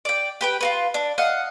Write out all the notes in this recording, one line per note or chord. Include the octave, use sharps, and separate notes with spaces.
D5 G5
G4 B4 G5
F4 F#4 B4
D4
D#5 F5 F#5